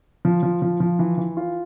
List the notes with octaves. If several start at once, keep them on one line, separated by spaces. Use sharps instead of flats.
F3
F3
F3
F3
E3
E3
F4